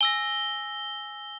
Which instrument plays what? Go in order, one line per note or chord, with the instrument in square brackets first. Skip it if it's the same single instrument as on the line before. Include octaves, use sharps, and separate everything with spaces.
[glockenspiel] G#5 E6 A#6 [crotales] G7